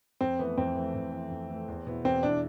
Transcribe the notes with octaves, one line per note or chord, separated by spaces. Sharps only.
F2 C4
E3 A3 B3
F2 C4
E3 A3
F2
E3 A3
F2
E3 A3
E2
B2 B3 E4
E2 C4
B2 B3 D4 E4